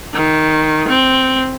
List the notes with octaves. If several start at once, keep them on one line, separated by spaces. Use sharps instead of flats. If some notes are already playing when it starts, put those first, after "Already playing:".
D#3
C4